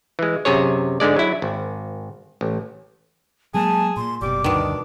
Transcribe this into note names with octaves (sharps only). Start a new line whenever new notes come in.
E3 G#3
F#2 C3 G#4 C#5
G#2 D3 G#3 D5
F#3 E4
G#1
A1
F#3 G#3 A#3 G#4 A5
A#2 C6
F#1 B2 G3 D6
D2 G2 B2 D#3 D4